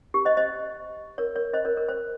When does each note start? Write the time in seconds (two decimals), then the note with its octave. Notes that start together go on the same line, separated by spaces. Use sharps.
0.14 G4
0.25 C5 D#5
0.37 C5 D#5
1.18 A#4 C#5
1.36 A#4 C#5
1.53 C5 D#5
1.65 A#4 C#5
1.77 A#4 C#5
1.89 C5